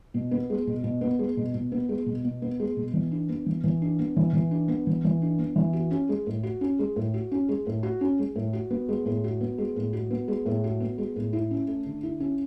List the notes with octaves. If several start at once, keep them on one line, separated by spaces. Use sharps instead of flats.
B2
B3
G#3
B2
B2
B3
G#3
B2
B2
B3
G#3
B2
B2
B3
G#3
B2
E3
D4
B3
E3
E3
D4
B3
E3
E3
D4
B3
E3
E3
D4
B3
E3
F#4
C#4
G#3
A2
F#4
C#4
G#3
A2
F#4
C#4
G#3
A2
F#4
C#4
G#3
A2
F#4
B3
G#3
A2
F#4
B3
G#3
A2
F#4
B3
G#3
A2
F#4
B3
G#3
A2
E4
C#4
A3
D3
E4
C#4